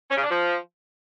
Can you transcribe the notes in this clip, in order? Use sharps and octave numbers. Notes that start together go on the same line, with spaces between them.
C#4
C#3
D4
F3